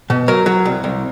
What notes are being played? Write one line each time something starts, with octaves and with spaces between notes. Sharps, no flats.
B2
F#3 A#4
F#3
C2
C2